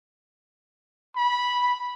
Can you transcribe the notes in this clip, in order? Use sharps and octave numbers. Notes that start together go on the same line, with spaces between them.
B5